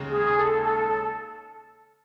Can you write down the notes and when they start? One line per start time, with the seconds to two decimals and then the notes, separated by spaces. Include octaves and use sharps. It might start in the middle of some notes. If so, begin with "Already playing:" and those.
Already playing: D#2 C#3 G#3
0.11 G#4
0.37 A4
0.62 A4
0.87 A4